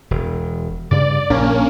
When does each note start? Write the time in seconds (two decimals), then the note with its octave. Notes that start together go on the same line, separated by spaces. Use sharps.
0.11 E1
0.91 G2 C#3 D5
1.30 A#1 A#3 C#4 D4